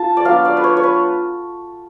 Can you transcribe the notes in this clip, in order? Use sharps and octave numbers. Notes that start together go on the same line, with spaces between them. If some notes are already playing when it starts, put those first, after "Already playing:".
Already playing: F4 A5
D5
F#3 B3 D4 F4 F5
D5
B4
C#5
C#5
B4